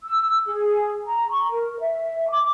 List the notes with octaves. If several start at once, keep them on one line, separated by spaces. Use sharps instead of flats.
E6
G#4
A#5
C#6
A#4
E5
D6